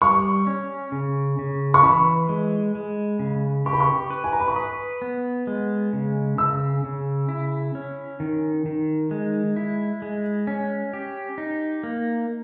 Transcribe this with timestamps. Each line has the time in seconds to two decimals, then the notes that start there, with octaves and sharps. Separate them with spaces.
0.02 G3 C#6
0.47 C#4
0.92 C#3
1.39 C#3
1.74 C#6
1.83 E3 B5
2.29 G#3
2.75 G#3
3.19 C#3
3.66 G4 C#6
3.73 B5
3.80 C#6
4.10 B4
4.24 G#5
4.32 A#5
4.40 B5
4.48 C#6
4.56 B4 D#6
5.02 B3
5.47 G#3
5.93 C#3
6.38 C#3 E6
6.84 C#3
7.29 E4
7.75 C#4
8.20 D#3
8.66 D#3
9.11 G#3
9.56 E4
10.02 G#3
10.47 C#4
10.93 G4
11.38 D#4
11.83 A#3